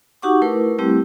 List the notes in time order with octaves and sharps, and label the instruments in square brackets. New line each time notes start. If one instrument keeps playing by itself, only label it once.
[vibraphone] D#4 F#4 G4 F#5 C#6 D6
A3 E4 A#4 B4
G3 A3 C4 E4 G4